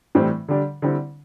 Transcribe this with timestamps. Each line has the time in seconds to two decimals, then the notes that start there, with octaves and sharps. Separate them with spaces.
0.15 A2 E3 G3 C4 E4
0.48 D3 G3 D4
0.82 D3 G3 C4 E4